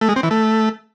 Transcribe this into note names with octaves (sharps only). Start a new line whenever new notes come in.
A3
G#3
C4
E3
A3